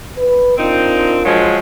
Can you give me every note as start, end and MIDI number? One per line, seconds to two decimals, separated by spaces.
0.17 0.57 71
0.58 1.18 60
0.58 1.49 62
0.58 1.18 63
0.58 1.49 65
0.58 1.49 70
1.25 1.59 53
1.25 1.59 54
1.25 1.59 56